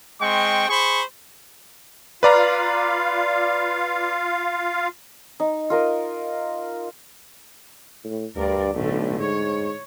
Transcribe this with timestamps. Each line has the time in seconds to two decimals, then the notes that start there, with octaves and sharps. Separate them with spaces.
0.21 G#3 C4 G5 C#6
0.69 G#4 C5 B5 C#6
2.23 F4 B4 D5 F5 A#5
5.40 D#4
5.70 F4 A#4 D#5
8.04 A2
8.36 D2 G2 A#4 D5
8.74 B1 A2 D3 A3
9.20 G#2 C#5